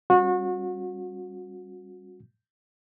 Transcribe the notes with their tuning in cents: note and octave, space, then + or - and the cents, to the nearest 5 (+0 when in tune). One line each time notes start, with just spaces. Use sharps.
G3 +0 C#4 -30 F#4 -30